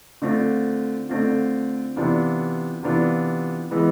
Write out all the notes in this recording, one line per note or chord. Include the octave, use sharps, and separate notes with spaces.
D3 A3 C4 F4
D3 A3 C4 F4
C3 E3 B3 D4 F4
C3 E3 B3 D4 F4
E3 G#3 B3